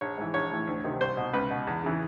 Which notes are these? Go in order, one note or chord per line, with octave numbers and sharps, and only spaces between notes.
A#1 C#5
G#2 E3
A#1 C#5
A2 E3
D2
C3 D#3
C2 C5
B2
C#2 B4
B2
E2
C#3 E3